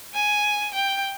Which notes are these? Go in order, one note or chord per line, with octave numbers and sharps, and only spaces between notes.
G#5
G5